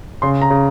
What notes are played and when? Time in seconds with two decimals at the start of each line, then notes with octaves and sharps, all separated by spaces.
0.22 C#3 C6
0.42 A#5
0.50 C#3